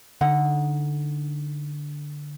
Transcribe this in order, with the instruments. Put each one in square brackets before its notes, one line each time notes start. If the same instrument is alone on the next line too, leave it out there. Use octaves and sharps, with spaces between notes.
[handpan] D3 [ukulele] D#4 F#5